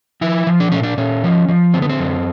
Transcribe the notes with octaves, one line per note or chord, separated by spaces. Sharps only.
F3 E4
F3
D4
A#2 C#4
D4
A#2 C#4
F3
F3
D3 C4
B3
C4
F#2